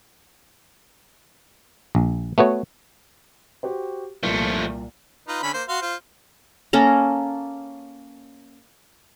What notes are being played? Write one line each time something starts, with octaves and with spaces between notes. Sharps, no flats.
A#1
A3 B3 F#4 C#5
F#4 G4 C5
C2 A#2 F3 A3
D#4 F4 B4
D3 C#4 B5
A#3 C5
F#4 F5 C6
F4 C5
A#3 C#4 A4 A#5